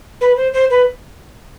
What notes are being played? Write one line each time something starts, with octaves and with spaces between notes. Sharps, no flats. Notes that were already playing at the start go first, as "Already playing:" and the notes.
B4
C5
C5
B4